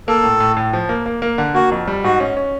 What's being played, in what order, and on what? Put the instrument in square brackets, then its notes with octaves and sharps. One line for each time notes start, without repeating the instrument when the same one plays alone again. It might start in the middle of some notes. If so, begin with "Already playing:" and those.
[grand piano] A#3 [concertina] A4
[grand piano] A2
A2
A2
F3
A#3
A#3
A#3
D3
[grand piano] A#3 [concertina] F#4
[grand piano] F2
G3
[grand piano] G#2 [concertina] F#4
[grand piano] C#4
C#4